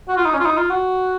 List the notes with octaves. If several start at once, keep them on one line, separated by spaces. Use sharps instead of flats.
F#4
F4
D#4
C#4
F4
D#4
F4
F#4